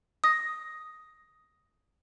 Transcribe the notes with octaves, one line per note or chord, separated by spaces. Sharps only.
D#6 A#6